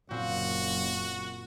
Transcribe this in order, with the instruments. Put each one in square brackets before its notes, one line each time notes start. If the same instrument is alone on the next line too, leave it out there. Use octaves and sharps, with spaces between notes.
[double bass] F#1 [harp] A#2 C4 [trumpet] F#4